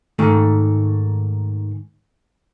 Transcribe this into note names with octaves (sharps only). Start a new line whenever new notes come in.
G#2 D#3 A3